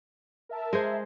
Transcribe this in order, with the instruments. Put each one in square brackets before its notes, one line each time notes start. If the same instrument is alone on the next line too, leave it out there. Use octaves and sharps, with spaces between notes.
[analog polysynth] A#4 E5 A5
[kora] G#3 G#4 C5